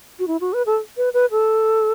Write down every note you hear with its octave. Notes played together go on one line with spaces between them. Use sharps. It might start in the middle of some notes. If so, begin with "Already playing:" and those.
F#4
E4
F#4
B4
A4
B4
B4
A4